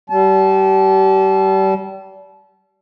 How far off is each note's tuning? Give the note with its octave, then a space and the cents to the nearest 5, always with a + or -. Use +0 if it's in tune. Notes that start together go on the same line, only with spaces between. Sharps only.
G3 -30 A5 -30